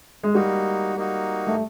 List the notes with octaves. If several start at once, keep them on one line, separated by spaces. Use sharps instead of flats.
G#3
G3 A#3 D#4 F#4
A#3 D#4 F#4
A3